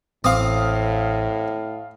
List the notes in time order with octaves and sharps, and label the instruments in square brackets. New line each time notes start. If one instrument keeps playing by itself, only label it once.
[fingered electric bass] A1 [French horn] A2 [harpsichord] C4 D6 [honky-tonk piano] F5 D#6